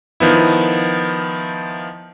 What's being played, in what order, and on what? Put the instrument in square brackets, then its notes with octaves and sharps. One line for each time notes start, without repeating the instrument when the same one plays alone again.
[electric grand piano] D#3 F3 B3 E4